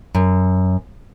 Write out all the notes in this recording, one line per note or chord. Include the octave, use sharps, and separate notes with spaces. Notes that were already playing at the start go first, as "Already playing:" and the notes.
F#2